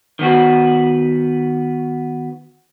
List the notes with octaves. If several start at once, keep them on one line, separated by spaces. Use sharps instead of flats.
D#3 B3 F#4